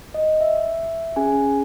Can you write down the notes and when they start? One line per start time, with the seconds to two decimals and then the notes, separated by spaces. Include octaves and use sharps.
0.14 D#5
0.41 E5
1.16 C#4 G#4 G#5